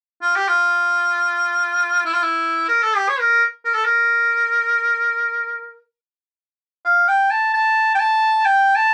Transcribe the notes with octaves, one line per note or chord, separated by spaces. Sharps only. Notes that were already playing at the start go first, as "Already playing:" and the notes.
F4
G4
F4
E4
F4
E4
A#4
A4
G4
C#5
A#4
A#4
A4
A#4
F5
G5
A5
A5
G5
A5
G5
A5